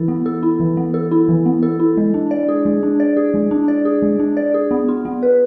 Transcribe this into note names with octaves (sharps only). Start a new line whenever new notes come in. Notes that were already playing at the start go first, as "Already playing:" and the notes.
Already playing: E3 E4 A4
B3
A4
E4
E3
B3
A4
E4
E3
B3
A4
E4
G#3
D4
D5
G#4
G#3
D4
D5
G#4
G#3
D4
D5
G#4
G#3
D4
D5
G#4
B3
F4
B3
B4